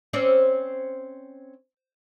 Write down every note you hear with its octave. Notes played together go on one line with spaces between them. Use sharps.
C4 C#4 D5